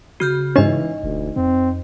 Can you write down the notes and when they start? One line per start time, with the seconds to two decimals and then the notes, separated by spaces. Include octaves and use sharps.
0.20 C#3 F#4 F6 G6
0.56 G#2 E3 C#4 D#4 D#5
1.03 E1 D2
1.36 F2 C4